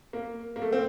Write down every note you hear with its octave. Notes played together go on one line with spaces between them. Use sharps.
A#3
A#3
A3
C4